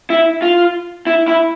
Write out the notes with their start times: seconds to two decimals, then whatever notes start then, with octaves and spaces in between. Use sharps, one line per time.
0.10 E4
0.42 F4
1.07 E4
1.28 E4